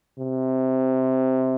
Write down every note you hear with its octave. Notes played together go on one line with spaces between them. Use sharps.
C3